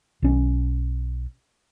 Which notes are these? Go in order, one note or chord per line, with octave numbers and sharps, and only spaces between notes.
B1 C#4